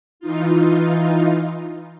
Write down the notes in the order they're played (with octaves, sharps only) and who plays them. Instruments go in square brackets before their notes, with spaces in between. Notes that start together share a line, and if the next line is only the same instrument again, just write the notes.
[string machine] E3 D#4 F4